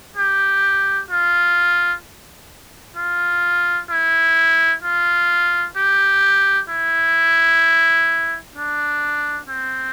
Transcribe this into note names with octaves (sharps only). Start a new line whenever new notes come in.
G4
F4
F4
E4
F4
G4
E4
D4
C4